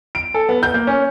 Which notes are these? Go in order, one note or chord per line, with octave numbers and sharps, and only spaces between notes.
D7
A4
B3
G6
A#3
C#4